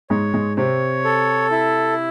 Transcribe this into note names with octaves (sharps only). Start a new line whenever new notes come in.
G#2 G#3 C#5
G#2 G#3
C3 C4 C#5
A4
E4